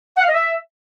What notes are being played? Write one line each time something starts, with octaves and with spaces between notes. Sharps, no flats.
F#5
F5
D#5
E5